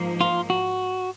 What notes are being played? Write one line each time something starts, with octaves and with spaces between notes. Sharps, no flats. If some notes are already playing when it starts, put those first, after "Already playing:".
Already playing: G#2 F3 A#3
F4
F#4